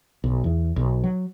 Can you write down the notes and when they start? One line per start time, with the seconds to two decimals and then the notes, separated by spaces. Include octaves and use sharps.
0.24 B1
0.44 E2
0.76 B1
1.04 F#3